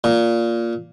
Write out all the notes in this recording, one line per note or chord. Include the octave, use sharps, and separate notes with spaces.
A#2